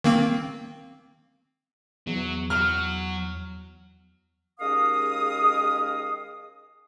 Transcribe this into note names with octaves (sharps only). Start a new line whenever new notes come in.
D#3 A#3 C4
E2 F#3
F#3 F6
D#2 G#3 C#4 A#4 F5 D#6